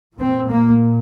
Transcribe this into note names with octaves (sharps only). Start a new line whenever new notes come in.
A#2 C4
A#3